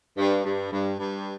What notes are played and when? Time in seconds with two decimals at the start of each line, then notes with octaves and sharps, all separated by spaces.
0.18 G2
0.45 G2
0.72 G2
0.99 G2